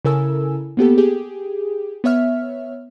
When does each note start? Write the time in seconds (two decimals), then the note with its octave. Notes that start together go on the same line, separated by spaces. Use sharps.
0.05 C#3 E4 A4 A#4 G#5 E6
0.77 A#3 B3 G4 A4
0.98 G4 G#4
2.04 B3 C#5 E5 F6